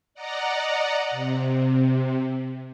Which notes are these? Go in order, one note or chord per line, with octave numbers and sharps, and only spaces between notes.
D5 D#5 F#5 A#5
C3